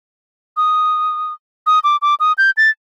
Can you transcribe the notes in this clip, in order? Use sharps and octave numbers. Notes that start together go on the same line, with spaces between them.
D#6
D#6
D6
D6
D#6
G6
A6